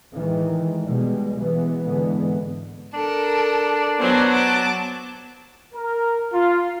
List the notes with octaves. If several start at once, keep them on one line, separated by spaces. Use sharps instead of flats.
A2 D#3 E3 G#3
B2 G3 G#3
E3 G#3 B3
G#2 D3 E3 G#3 B3
D4 A4 A#4
F#3 B3 C5 C#5 G#5
A5 D6
A#4
F4